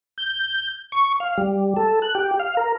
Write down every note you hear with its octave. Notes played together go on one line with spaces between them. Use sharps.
G6
C#6
F5
G3
A4
F#6
G4
F5
A#4